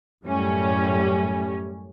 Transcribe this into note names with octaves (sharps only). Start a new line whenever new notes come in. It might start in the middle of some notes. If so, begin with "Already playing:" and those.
F#2 A2 G3 C#4